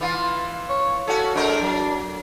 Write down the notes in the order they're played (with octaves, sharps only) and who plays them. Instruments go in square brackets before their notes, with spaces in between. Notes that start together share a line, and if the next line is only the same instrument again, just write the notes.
[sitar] E3 F4
[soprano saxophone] C#5
[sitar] C#4 F#4 [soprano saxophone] A4
[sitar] G#3 A3 A#4 [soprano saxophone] D4
[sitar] F#3